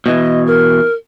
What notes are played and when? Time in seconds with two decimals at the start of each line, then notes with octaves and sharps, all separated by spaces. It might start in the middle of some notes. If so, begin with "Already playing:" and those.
0.06 B2 E3 D#5
0.46 A#4